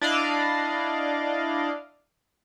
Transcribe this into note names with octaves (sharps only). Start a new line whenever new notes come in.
D4 E4 D5 D#5 F5